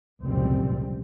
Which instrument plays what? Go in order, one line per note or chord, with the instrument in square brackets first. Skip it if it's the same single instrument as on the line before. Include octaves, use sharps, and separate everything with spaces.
[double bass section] F1 C#2 F#2 A#2 G3 C4